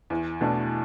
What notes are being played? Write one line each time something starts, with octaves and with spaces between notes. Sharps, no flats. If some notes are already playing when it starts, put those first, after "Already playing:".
E2
B2 A3 D4